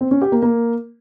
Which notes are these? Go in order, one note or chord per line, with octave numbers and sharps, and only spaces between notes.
C4
C#4
G4
A#3
A#3